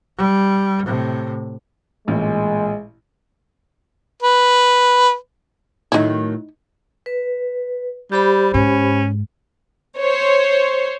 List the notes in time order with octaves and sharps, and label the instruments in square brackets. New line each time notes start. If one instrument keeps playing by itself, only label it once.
[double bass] G3
A2 C3
[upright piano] A1 A#2 [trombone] G#3
[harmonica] B4
[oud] A2 D#3 F#3 [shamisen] D#4 E4
[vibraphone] B4
[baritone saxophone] G3 [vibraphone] G4 C5 B5
[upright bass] G#2 [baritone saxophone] C#4
[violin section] C5 C#5